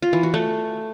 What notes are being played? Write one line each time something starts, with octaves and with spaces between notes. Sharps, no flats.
F4
E3
F#4
A3